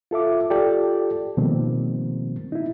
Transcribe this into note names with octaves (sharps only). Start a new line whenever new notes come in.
F4 A4 E5 D6
F4 G4 A4 D5 G5
B2 D#3 F3 G3 A#3 C4
D#4 E4